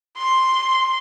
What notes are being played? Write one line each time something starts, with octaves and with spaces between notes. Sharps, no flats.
C6